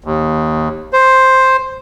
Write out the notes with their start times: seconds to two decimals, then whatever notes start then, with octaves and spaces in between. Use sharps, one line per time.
0.04 D#2
0.93 C5